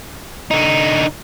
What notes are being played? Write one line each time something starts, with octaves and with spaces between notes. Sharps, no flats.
D3 D#4